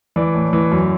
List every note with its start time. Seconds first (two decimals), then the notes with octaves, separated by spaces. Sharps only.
0.16 E3 D5
0.35 A2
0.53 E3
0.72 F#2